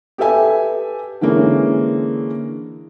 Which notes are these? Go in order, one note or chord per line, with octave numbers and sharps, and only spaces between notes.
G4 A4 B4 E5 G#5
D3 E3 G#3 A#3 C#4